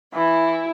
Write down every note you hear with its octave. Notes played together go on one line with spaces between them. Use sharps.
E3 E4